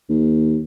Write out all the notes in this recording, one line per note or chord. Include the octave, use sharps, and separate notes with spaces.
D#2